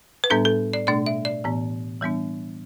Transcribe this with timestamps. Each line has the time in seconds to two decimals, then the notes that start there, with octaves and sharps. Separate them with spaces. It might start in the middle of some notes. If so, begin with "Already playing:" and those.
0.24 B4
0.30 A2 G3 B3 D4 A4
0.45 A4
0.73 D5
0.87 B2 A3 D4 D5
1.06 E5
1.25 D5
1.44 A2 E3 B3
2.01 E3 G3 B3 D4